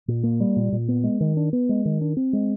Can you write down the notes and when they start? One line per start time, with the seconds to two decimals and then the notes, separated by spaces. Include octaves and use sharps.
0.08 A#2
0.23 A#3
0.40 G3
0.56 A#2
0.72 A#2
0.88 B3
1.04 G#3
1.21 D#3
1.37 D4
1.53 B3
1.69 G#3
1.85 D#3
2.01 D4
2.17 C4
2.33 G#3